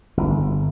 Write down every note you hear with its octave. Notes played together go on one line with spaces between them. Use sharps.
G1